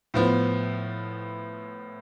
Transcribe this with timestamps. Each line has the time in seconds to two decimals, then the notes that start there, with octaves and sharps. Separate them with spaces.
0.14 A2 F3 B3